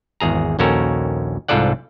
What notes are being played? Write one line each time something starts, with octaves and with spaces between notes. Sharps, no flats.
G#1 E2 G#4 A#5
A#1 D#2 C#4 F#4 A4 A#4
C2 G#2 F4 A4 D5 F#5